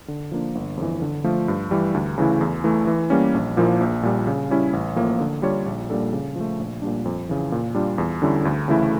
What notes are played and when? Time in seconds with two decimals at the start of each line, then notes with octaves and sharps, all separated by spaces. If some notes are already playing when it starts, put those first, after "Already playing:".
0.08 D3
0.32 F3 A#3 D4
0.55 G1
0.77 F2 E3
1.02 D3
1.24 F3 A3 D4 F4
1.48 G2
1.71 E3 G3
1.94 D2
2.18 C#3 E3 A3 E4
2.41 E2
2.64 E3 A3
2.87 E3
3.10 G3 A#3 C#4
3.34 A#1
3.57 A#2 F3 A#3 E4
3.80 A#1
4.03 A#2 G3
4.27 C#3
4.50 G3 C#4 E4
4.73 A1
4.96 A2 F3 A#3
5.20 D3
5.42 G3 D4 F4 C#5
5.66 A#1
5.90 A#2 G3 D4 A4
6.13 C#3
6.36 F3 A3
6.59 A#1
6.82 A#2 G3 D4
7.05 F2
7.29 C#3 E3
7.52 A#2
7.75 G3 D4 F4
7.98 E2
8.22 D3 G3 C#4 E4
8.45 D2
8.68 C#3 E3 A3 E4